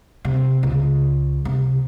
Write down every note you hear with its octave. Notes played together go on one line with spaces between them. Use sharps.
C3
C#2
C3